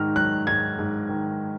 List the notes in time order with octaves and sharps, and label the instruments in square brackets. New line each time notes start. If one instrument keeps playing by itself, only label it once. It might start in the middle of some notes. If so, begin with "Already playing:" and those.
Already playing: [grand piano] G#2 D#3 F6
F#3 F#6
G#2 G#6
G#2
D#3